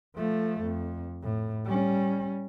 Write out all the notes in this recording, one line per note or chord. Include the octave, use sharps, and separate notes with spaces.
F3 A3
F2
A2
G3 C#4